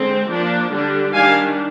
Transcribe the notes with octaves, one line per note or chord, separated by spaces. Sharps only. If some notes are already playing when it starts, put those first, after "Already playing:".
Already playing: D3 G#3 C4
F3 A#3 D4
D3 G3 D4
D#3 G3 D4 F5 G#5